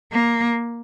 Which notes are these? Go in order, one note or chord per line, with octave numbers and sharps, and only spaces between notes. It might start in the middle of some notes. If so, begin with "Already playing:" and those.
A#3